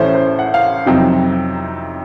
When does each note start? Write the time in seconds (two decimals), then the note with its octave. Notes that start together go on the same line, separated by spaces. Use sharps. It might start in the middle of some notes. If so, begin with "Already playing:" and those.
Already playing: A1 A2 A3 C#4 C5
0.14 C5
0.39 F#5
0.54 F5
0.86 F2 C3 F#3 C4 D#4